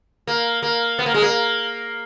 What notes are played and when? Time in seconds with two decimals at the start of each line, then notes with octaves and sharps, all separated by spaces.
0.27 A#3
0.63 A#3
0.99 B3
1.06 A#3
1.14 G#3
1.22 A#3